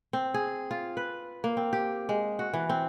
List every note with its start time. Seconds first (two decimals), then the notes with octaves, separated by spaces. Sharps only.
0.13 C4
0.34 G#4
0.71 F4
0.97 B4
1.44 A#3
1.57 C4
1.73 G4
2.09 G#3
2.39 F#4
2.54 E3
2.70 C4